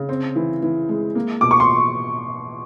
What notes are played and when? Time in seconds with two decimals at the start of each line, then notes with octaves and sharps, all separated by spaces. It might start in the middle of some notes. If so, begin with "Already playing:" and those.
Already playing: C#3
0.09 C4
0.36 E3
0.63 E3
0.89 G#3
1.15 A#3
1.41 B2 D6
1.51 C#6
1.60 C6